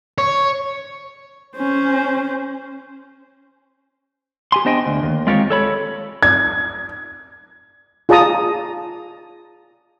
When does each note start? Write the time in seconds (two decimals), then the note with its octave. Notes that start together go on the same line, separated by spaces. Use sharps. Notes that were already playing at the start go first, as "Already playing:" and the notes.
0.18 C#5
1.57 C#4 C5
4.52 G4 G#5 C6
4.65 B3 D4 C5 D#5 G5 G#5
4.86 D2
5.03 D#2
5.27 G#3 C4 F4 G4 A#4 C#5
5.50 A4 C#5 B5
6.23 G#6
8.09 F4 G#4 D5 A5 A#5 D#6